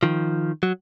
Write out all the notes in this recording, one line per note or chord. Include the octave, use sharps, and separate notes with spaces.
D#3 F3
F#3